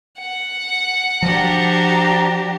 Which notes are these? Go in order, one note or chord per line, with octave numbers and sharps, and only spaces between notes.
F#5
F3 D4 F#4 G4 A#5